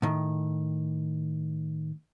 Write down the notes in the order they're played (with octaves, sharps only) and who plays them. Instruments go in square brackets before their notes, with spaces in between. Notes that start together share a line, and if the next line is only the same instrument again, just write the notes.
[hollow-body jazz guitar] A2 D#3